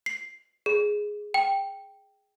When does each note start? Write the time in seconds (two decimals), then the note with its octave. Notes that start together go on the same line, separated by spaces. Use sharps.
0.06 C7
0.66 G#4
1.34 G5